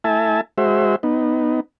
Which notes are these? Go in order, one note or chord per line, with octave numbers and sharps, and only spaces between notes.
A3 E4 E5 G#5 A5
G#3 F#4 C5 E5
B3 D#4